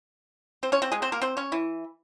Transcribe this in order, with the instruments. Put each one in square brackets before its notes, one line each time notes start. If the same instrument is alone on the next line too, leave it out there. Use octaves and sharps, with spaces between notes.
[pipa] C4 C5
C#4 C#5
C4 C5
G#3 G#4
C4 C5
A#3 A#4
C4 C5
C#4 C#5
E3 E4